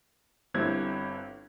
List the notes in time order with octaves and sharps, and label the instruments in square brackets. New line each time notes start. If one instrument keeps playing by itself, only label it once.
[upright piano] G1 G2 C4 E4 G#6